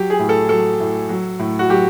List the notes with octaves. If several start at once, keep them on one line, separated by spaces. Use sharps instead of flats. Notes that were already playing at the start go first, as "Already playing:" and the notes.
Already playing: F#3 G4
G#4
A2
A4
F#3 A4
A2
F#3
A2
F#4
F#3 G4